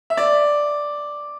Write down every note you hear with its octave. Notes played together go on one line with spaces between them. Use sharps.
E5
D5